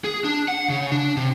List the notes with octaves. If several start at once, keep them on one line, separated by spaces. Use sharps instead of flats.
G#4
D4
F#5
C#3
D4
C3